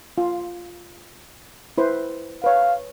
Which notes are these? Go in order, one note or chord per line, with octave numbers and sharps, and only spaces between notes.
F4
E4 B4 C5
B4 C#5 F5